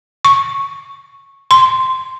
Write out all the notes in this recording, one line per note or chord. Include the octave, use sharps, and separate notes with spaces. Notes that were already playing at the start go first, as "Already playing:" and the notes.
C#6
C6